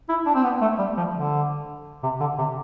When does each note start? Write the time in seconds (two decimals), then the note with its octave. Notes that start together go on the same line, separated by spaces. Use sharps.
0.09 E4
0.26 D4
0.35 C4
0.44 B3
0.61 A3
0.79 G3
0.97 F3
1.14 D3
2.03 C3
2.20 D3
2.38 C3